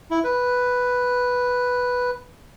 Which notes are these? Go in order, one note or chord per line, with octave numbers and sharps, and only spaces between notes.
E4
B4